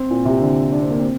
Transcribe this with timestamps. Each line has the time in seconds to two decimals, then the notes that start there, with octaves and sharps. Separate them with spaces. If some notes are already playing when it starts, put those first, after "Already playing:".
Already playing: C4
0.10 A#2
0.25 C3
0.41 D3
0.72 D4
0.81 C4
0.90 A#3
0.99 C4